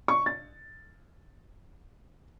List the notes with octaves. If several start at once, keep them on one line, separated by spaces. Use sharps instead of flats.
C#6
A6